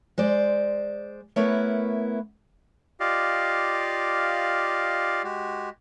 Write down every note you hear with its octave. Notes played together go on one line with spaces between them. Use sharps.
G#3 C5 D5
A3 B3 E4 A#4 B4 C#5
F4 G4 D5 D#5 F5
G#3 F#4 G4